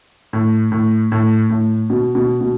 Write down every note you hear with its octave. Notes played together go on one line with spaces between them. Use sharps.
A2
A2
A2
A2
B2
B2
B2